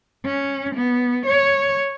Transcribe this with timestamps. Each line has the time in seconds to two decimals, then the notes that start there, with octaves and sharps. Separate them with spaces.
0.25 C#4
0.75 B3
1.26 C#5